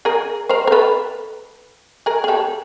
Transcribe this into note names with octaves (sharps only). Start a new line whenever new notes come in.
G#4 A#4
A#4 C5
A#4
A4 B4
G#4 A#4
G#4
G4 A4